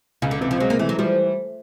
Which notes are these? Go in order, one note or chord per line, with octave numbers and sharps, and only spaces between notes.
C#2 C#3
D3
C3 E3
F3
F#3 G#3
A#3
E3 A3
F#3
F3 G3